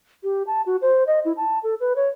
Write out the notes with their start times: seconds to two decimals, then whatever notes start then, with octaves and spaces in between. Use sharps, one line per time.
0.23 G4
0.47 A5
0.66 F#4
0.82 C5
1.07 D#5
1.25 E4
1.37 A5
1.63 A4
1.80 B4
1.96 C#5